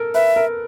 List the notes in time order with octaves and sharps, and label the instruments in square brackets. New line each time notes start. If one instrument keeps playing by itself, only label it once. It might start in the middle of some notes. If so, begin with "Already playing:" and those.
Already playing: [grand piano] A4 A#4
[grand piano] B4 [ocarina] E5
[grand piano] A#4